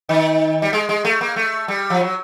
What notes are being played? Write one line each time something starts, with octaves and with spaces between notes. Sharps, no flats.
D#3
G3
G#3
G#3
A3
A#3
A3
G3
F3
F#3